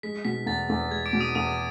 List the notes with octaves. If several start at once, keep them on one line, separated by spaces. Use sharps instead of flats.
G#3 B6
B2 B6
E2 A6
E2
G#3 G#6
D6 D7
B2
D#6 D#7
E2 D#6 D#7